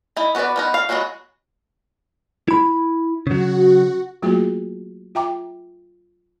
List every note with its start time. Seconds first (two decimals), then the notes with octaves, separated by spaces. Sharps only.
0.17 D#4 E4
0.35 B3 F#4 A4 B4 D5
0.56 F3 B3 D#4
0.74 F5
0.89 F#3 G#3 B3 D4 F#4
2.48 E4 B5
3.27 C#3 F#3 F#4
4.22 F#3 A3 A#3 F4 F#4 G#4
5.15 F4 E5 G5 A#5 D6